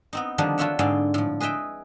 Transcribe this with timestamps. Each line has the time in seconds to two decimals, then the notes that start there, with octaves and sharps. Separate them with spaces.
0.13 B3 C4 D#4
0.38 D3 D#3 F3 G3 D4 D#4
0.58 D4 F4 F#4 C#5 E5 F#5
0.79 G#2 D3 C4 G#4 D5 F5
1.14 A2 F3
1.40 G#4 B4 D#5 E5 G5